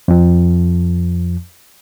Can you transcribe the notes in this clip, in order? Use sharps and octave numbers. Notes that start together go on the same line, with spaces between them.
F2 F3